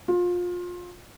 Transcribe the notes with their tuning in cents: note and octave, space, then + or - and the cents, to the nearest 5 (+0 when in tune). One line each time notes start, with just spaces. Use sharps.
F4 +25